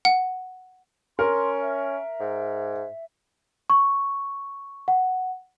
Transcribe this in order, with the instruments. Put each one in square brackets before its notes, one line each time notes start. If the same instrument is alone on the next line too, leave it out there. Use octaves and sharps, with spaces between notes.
[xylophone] F#5
[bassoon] C#4 [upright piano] A#4 [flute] C6
[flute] E5
[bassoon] G#2
[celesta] C#6
F#5